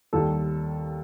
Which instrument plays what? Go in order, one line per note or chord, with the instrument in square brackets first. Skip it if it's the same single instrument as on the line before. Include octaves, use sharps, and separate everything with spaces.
[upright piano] D#2 D#3 G3 A4